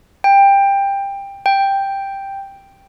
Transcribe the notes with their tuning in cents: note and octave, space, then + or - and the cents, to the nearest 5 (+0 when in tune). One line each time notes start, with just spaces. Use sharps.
G5 +15
G5 +5